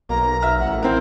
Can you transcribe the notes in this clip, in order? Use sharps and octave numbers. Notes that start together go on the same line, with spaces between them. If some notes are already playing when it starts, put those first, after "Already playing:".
B1 A#3 A#5
E5 F6
A1 F#5
C4 E4 A#4 C5